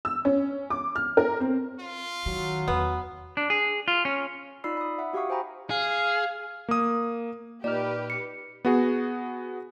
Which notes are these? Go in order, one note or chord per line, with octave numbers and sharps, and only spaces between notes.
E6
C#4
D6
F6
A#4
C4
F4
D#3 F#3
E2 B3
D4
G#4
F4
C#4
D#4 F4 D5 B5 E6 C7
B5 D#6
E5 F#5
F#4 G4 F5 F#5 C#6 D#6
C5 G5 G#5 A#5 B5
G#4 F5
A#3 D#6
A#2 D#4 G4 B4 D5 F6
C#7
B3 F#4 G#4